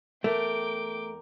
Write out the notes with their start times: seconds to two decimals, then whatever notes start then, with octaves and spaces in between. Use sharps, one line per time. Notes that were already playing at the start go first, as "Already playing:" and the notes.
0.24 E2 A3 A#4 G5 D6